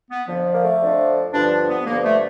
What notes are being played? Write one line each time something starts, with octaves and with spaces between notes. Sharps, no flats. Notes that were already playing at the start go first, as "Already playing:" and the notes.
B3
F2 D3 F3
A#3
A3
F2 D3 F3
G2 D3 F3 D4
B3
G2 D3 F3 A#3
A3